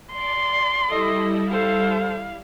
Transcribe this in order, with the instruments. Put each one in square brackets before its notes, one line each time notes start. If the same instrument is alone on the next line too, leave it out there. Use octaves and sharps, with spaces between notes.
[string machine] D5 [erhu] C6
[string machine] G3 E4 [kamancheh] A4 D#5
[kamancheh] A4 C5 [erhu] F5